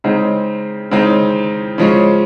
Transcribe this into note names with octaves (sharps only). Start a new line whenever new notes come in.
C#3 G#3 C4 D#4
C#3 G#3 C4 D#4
C#3 F3 G#3 C#4